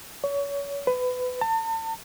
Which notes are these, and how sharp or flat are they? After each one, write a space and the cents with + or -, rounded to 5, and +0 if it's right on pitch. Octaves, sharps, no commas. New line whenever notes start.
C#5 +30
B4 +25
A5 +40